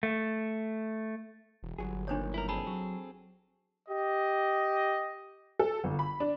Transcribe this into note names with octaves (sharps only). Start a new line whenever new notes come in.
A3
E1
G1 F#3 G#4
B1 A#2 D#3 D4 C5 C#5
E4 A#4
C4 G#4 A4 B5
F#3
G4 D#5
A4
G1
B5
D4